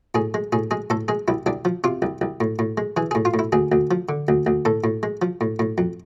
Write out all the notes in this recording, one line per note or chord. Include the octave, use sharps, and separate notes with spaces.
A2 G#4
G#3
A2 G#4
G#3 G#4
A2 A4
G#3 G#4
C2 E4
C2 D4
F3
C3 F4
C2
C2
A2
A2
G#3
E3 G#4
G#4
A2
F4
A2
E4
D2 G#4
D2
F3
D3
D2
D2
A2 A4
A2
G#3
F3
A2
A2
F2